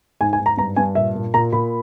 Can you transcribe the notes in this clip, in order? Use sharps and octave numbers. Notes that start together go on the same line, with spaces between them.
G#2 G#5
G#5
G#2
A#5
G2 A#5
G2 G#5
A#2 E5
A#2
A#2 A#5
A#2 B5